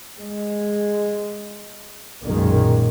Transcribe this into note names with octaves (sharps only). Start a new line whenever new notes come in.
G#3
B1 F#2 A#2 D#3 G#3